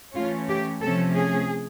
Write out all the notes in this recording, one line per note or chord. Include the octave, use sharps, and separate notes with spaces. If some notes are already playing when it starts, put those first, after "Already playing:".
E3 A3 C#4 F4
G4
C3 F3 A3 C#4 A4
G#4